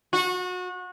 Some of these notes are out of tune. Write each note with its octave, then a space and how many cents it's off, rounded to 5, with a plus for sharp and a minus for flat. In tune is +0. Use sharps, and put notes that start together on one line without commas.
F#4 -30